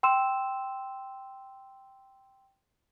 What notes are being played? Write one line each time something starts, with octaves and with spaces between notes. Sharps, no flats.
G5 C6 E6 E7